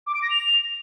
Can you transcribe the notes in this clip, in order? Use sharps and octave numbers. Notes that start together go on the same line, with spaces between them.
D6
D7
A#6
F7